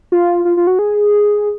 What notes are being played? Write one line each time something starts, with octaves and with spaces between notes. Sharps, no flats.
F4
F4
F4
F#4
G#4